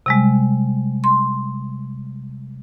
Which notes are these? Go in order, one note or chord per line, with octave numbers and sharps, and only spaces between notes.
C3 G3 G#3
C6